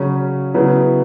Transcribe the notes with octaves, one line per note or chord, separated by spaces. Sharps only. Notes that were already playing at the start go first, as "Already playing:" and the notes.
Already playing: C#3 F#3 C#4
C#3 F#3 B3 E4